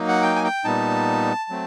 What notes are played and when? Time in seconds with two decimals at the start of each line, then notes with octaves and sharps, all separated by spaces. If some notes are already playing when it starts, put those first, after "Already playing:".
Already playing: F#3 A#3 D#4
0.08 F#5
0.22 G5
0.36 G#5
0.44 G5
0.65 A#2 G3 B3 D#4 A5
1.50 F#3 A3 C4